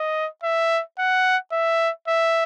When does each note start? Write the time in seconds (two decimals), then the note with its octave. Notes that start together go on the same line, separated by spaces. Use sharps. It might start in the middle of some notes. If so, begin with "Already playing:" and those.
Already playing: D#5
0.43 E5
0.99 F#5
1.52 E5
2.07 E5